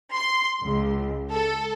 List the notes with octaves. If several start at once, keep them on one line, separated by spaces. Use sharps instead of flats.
C6
C#2
A4